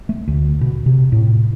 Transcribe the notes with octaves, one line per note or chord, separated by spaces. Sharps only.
A3
D2
B2
C3
A2